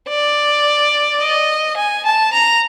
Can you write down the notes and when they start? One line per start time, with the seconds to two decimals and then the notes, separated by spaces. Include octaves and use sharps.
0.08 D5
1.21 D#5
1.77 G#5
2.06 A5
2.33 A#5